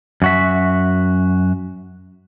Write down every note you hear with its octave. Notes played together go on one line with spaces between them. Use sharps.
F#2 F#4 E5